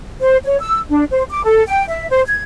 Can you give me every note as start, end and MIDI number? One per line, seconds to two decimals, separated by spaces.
0.21 0.37 72
0.45 0.59 73
0.60 0.79 88
0.90 1.04 62
1.11 1.22 72
1.30 1.44 86
1.44 1.63 69
1.67 1.85 79
1.88 2.08 76
2.10 2.22 72
2.27 2.42 92